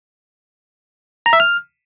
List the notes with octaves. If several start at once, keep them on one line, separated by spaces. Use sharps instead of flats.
A#5
E5
F6